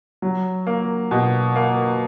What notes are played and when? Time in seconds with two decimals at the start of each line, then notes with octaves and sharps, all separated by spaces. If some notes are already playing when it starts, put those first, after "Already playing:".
0.22 F#3
0.67 A#3
1.11 B2
1.56 A#3